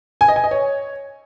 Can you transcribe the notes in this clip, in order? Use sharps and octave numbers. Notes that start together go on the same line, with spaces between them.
G#5
D#5
G#5
D#5
C#5